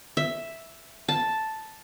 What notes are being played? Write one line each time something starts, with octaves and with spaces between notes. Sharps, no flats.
E5
A5